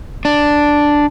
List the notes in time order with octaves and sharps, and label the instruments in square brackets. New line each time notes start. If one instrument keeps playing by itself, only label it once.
[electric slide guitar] D4